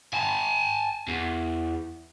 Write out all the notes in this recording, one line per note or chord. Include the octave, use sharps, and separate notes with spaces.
G#5 A5
E2